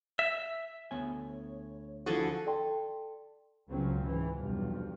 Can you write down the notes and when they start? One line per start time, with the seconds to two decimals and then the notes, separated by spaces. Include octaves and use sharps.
0.19 E5
0.91 D2 B3 C#5 G#5
2.06 D3 F3 E4 F#4 G#4 A4
2.46 A4 D5 G5 A5 C6
3.70 C#2 C#3 F#3 C4 C#4
4.05 G#2 E3
4.37 B1 E2 G2 C3 F3 G3